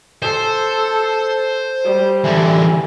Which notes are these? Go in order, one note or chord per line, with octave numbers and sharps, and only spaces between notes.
A4 C5
G3
D3 E3